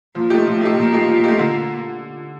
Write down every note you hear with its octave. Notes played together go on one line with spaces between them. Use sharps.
A#2 F3
A3 D#4 G4
A2 F3
A3 D#4 G4
A#2 F3
A3 D#4 G4
F3
A3 D#4 G4
D3